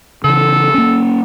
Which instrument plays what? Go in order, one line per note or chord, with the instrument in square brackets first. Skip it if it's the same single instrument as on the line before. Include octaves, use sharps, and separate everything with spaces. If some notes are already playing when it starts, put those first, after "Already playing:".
[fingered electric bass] C#3 E3 [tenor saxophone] A4
[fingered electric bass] A#3 C#4